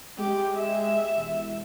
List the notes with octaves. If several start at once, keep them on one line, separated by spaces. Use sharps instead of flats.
G#3 G4
E5
E1